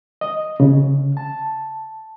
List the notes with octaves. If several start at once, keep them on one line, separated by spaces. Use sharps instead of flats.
D#5
C#3
A5